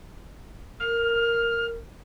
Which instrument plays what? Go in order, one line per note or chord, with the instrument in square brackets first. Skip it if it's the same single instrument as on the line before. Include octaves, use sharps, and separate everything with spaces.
[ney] A#4 [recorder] F6